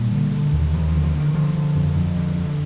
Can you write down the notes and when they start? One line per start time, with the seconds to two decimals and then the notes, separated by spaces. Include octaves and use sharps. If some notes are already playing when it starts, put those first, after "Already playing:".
Already playing: A#2 G3
0.11 D3
0.32 D3
0.52 D#2
0.73 D#2 F3
0.88 D3 F3
1.03 F3
1.14 D3
1.19 D#3
1.34 D3 F3
1.55 D3
1.75 F2
1.96 F2
2.16 D3
2.36 D3